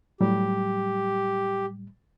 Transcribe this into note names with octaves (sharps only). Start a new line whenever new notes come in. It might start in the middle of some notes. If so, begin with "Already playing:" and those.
A2 F#3 G3 G4